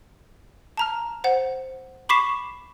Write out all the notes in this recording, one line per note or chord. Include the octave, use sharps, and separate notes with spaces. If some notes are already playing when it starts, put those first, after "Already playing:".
A5 A#5 F6
C5 F#5
B5 C#6 D6 B6 C7 E7